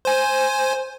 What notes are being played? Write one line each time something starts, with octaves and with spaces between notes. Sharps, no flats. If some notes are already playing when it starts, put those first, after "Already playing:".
C5 G#5